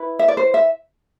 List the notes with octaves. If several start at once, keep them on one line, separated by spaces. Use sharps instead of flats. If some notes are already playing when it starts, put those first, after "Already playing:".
Already playing: E4 B4
E5
D5
C5
E5